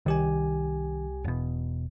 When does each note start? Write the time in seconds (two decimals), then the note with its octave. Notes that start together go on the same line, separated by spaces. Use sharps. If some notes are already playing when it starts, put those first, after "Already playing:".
0.06 C2 D#3 G4 G#5
1.24 E1 B2